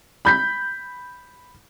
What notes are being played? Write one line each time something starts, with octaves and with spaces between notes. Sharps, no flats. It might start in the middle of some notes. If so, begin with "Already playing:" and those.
B5 G6 B6